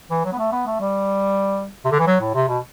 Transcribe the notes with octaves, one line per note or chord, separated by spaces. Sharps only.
E3
F#3
B3
A3
B3
A3
G3
C3
D3
E3
F#3
A2
C3
B2